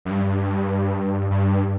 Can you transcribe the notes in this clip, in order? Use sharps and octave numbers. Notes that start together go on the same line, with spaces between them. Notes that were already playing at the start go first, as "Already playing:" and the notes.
F#2
G2
G2